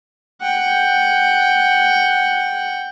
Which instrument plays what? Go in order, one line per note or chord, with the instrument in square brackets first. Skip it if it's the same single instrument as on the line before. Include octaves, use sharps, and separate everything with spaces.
[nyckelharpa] F#5 G5